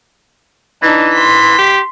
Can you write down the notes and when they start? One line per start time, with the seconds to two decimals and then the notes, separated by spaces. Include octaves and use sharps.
0.82 E3 D4 D#4
1.13 C6 B6
1.58 G4